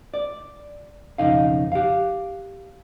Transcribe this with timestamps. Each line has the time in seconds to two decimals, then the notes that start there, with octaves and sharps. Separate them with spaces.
0.14 D5
1.18 B1 F2 C#3 D#4 F5
1.72 G4 F5